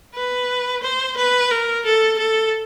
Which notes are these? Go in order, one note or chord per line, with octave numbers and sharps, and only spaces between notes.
B4
C5
B4
A#4
A4
A4